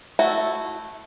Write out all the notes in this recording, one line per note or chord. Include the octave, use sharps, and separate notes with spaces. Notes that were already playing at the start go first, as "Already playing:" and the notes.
A3 E4 F#4